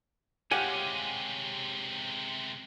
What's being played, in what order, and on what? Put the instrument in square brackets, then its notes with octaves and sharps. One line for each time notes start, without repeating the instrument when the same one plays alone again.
[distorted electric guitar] C3 G#3 [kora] G4 F5 F#5 [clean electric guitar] C#5 G#5